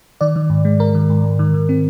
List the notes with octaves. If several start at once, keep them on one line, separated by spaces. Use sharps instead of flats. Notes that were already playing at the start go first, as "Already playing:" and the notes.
D#3 D5
D#3
G#2
G#3
G#3 A#4
D#3
G#2
G#2
D#3
D#3
C4